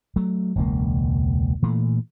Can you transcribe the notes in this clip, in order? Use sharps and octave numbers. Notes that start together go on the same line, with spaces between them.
F#3 A3
E1 C#2 A#3
A#2 E3 A3